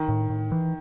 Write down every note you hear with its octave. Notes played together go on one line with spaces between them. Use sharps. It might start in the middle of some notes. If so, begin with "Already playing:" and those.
Already playing: D#3
A2
A2
E3